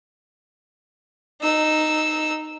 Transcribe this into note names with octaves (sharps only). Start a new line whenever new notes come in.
D#4 E6